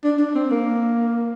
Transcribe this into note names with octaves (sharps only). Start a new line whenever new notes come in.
D4
D4
C4
A#3